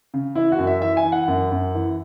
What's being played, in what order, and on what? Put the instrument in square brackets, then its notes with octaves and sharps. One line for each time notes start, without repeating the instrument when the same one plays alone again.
[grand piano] C#3
E3 E4
F#4
F#2
E5
E3 E5
G#5
E3
F#5
F#2
F#2
E3